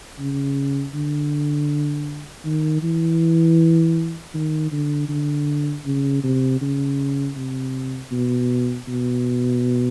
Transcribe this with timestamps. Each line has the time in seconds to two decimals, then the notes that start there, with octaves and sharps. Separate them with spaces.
0.19 C#3
0.94 D3
2.45 D#3
2.83 E3
4.34 D#3
4.72 D3
5.09 D3
5.85 C#3
6.24 C3
6.61 C#3
7.36 C3
8.11 B2
8.88 B2